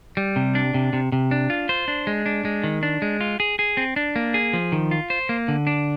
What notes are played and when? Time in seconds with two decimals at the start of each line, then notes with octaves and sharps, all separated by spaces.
0.17 G3
0.36 C3
0.55 D4
0.74 C3
0.93 C3
1.12 C3
1.31 D4
1.50 F4
1.69 C5
1.88 D4
2.07 G#3
2.26 D4
2.45 G#3
2.64 D#3
2.83 D4
3.02 G#3
3.21 F4
3.40 G#4
3.59 G#4
3.77 C4
3.96 D4
4.16 A#3
4.34 G#4
4.53 F3
4.72 D#3
4.91 F4
5.10 C5
5.29 A#3
5.48 D3
5.67 D4